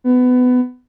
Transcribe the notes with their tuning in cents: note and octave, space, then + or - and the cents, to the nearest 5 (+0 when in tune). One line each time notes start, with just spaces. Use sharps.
B3 +20